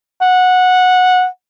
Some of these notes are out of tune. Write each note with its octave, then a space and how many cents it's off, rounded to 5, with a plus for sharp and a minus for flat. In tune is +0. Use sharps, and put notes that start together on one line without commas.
F#5 -15